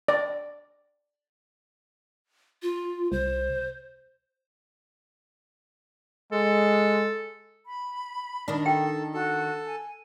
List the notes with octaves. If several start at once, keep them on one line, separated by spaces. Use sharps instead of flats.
D5
F4
C2 C5
G#3 A4
B5
D#3 D4
A4 G5
F#4 A4
G#5